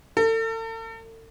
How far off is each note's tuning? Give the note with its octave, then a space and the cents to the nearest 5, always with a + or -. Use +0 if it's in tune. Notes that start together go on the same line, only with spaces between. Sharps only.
A4 +40